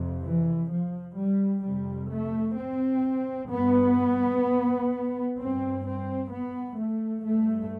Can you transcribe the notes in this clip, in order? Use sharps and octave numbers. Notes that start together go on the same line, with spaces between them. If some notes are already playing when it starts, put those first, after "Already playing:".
Already playing: F2 C3
E3
F3
G3
F2 C3 G3
A3
C4
G2 B3
G2 C4
C4
B3
A3
G2 A3